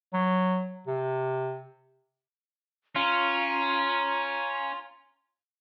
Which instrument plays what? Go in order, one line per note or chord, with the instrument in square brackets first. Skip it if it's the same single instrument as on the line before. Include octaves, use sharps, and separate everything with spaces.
[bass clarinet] F#3
C3
[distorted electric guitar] C#4 [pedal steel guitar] F4 [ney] A#5